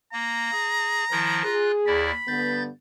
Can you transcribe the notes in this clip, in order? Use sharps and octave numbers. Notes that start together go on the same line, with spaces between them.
A#3 A#5
G#4
D#3 F3 E4
F4 G#4 F#6
D#2 E4 D5 B5
G2 D3 B3 G6 A6